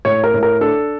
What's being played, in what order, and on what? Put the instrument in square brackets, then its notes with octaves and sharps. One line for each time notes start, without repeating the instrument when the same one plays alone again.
[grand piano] A2 C#5
A#4
A2
A#4
D4 A4